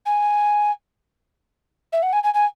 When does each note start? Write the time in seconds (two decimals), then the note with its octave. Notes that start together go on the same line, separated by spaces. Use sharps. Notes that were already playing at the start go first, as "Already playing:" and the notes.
0.06 G#5
1.93 E5
2.02 F#5
2.13 G#5
2.23 G#5
2.34 G#5